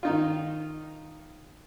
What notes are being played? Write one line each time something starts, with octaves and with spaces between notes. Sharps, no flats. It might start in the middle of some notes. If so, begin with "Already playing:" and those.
D#3 D#4 F4